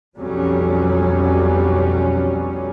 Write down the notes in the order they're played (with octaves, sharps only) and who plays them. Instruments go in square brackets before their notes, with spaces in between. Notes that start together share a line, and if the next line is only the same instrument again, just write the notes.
[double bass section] B1 F2 F#3 G3 C#4